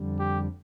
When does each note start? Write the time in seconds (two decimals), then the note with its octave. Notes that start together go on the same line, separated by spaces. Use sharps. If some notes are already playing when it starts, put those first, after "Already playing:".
Already playing: F2 D3 G3
0.19 G4